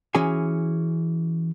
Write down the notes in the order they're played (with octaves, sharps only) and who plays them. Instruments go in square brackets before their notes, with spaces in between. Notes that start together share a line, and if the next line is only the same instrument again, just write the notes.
[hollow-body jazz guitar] E3 C#4 F#4 G#4 G#5